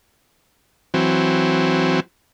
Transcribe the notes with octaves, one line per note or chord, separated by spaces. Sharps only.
E3 F#3 C4